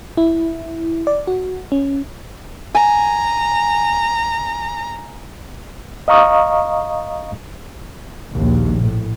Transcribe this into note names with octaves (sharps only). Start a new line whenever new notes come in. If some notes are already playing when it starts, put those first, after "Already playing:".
E4
D5
F#4
C#4
G#5 A#5
D#5 F5 A#5 C#6 D#6
A#1 D#2
A2